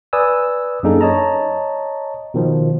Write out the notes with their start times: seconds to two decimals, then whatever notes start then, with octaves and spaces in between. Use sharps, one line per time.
0.13 B4 D5 G#5 D#6 E6
0.83 F#2 A#3 D4 D#4 G#4 A4
1.01 C#5 D#5 A5 A#5
2.34 B2 D#3 F3